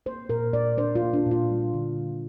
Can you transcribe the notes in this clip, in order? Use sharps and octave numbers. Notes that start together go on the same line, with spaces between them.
A#3 C5
A#2 A#4
A#2 D5
D4 C5
F4
A#3
D4
A#2
F4
G3
D3
D3